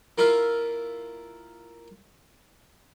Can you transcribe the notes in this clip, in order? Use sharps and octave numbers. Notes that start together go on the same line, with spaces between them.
A#3 E4 F4 E5 F5